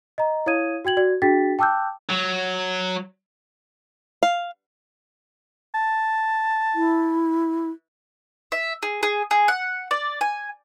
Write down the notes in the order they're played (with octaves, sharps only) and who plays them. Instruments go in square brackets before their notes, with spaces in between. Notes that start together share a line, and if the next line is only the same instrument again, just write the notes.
[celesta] D#5 A#5
E4 C#5 F5 D#6 G#6 D#7
F#4 G5 G#6 F#7
F#4 D5 G#6
D4 F#4 G#4 G5 A6 B6
G5 A5 D6 E6 F#6 G6
[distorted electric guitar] F#3
[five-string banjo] F5
[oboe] A5
[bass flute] E4
[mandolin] E5
G#4
G#4
G#4
F#5
D5
G#5